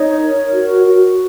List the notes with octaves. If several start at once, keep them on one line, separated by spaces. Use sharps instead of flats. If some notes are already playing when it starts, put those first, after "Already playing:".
Already playing: D#4 C#5
A#4
F#4
F#4